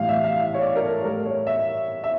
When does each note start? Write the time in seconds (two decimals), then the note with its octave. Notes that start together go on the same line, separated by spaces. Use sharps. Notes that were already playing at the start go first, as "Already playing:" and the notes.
Already playing: A2 E3 G3 F5
0.09 E5
0.24 F5
0.40 F5
0.54 C#5
0.62 D5
0.76 A#4
0.83 A4
1.04 A2 G3 A#4
1.26 C#5
1.47 E5
2.04 E5